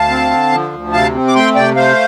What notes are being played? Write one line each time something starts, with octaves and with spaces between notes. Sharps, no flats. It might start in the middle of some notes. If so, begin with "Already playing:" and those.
Already playing: D2 F5 A5
C4
D3
F3
D2
C3 F5 A5
C4
D6
A3 G5 C6
C3 D5 G5
A3 C5 F5